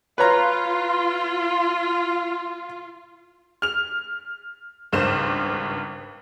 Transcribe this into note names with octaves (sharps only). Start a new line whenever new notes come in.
F4 B4 C#5 A#5
F6 F7
G#1 C#2 G2 C5 E7